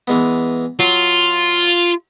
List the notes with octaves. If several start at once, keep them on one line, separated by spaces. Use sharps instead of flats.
E3 G#3 B3
F#3 F4